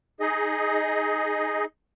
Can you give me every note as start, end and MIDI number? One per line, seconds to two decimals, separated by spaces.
0.20 1.65 63
0.20 1.65 68
0.20 1.65 75